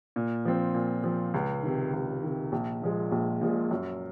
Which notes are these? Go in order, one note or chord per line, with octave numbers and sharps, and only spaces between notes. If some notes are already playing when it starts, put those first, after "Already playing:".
A#2
F3 C4
A#2
F3 C4
C#2
C3 D#3
C#2
C3 D#3
A#1
A#2 F3 G#3
A#1
A#2 F3 G#3
F#2